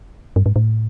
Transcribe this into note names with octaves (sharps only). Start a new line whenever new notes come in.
G2
G#2
A2